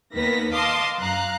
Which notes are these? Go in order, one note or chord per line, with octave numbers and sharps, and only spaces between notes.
D#2 D#3 B3 B4 A#6 B6
D#5 F5 A5 C6 D6 D#6
F#2 F5 A#5 F#6